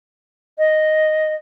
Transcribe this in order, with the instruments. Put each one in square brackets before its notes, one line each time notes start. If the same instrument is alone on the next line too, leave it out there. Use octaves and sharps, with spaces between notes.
[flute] D#5